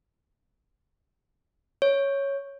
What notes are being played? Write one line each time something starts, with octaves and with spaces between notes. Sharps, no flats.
C#5